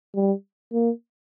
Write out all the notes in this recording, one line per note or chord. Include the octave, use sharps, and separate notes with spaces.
G3
A#3